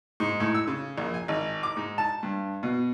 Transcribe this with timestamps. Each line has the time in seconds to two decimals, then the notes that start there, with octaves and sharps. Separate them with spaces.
0.20 G#2
0.40 A2
0.55 E6
0.67 C#3
0.98 A#1
1.14 G#5
1.28 G#1
1.63 D6
1.77 G#2
1.98 A5
2.23 G2
2.63 B2